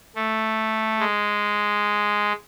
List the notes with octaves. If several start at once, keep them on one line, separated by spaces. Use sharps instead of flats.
A3
G#3